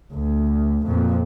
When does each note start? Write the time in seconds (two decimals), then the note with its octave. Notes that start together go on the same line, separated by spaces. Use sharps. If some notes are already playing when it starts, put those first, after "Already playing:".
0.13 D2
0.86 F2 A#2